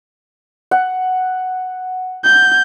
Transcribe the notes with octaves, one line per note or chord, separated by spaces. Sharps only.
F#5
G6